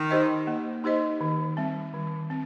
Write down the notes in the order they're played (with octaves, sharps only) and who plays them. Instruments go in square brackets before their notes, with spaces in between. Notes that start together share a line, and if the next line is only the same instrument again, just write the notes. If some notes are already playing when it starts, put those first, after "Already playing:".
Already playing: [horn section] D#3
[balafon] D#4 G4 C5 D#5
A#3
D#4 G4 C5 D#5
D#3
G3 C4
D#3
C4